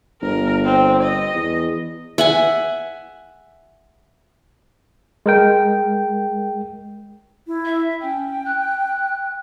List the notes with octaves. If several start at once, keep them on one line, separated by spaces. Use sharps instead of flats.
G1 A#4
C4
D#5
E2
E5 F#5 G#5
G#3 A#4 G5
E4
E5
C#4 G5
F#6